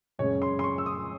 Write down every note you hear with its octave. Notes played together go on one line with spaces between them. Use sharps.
F#2 C#3 G#3 C#5
C6
C6
C#6
E6
D#6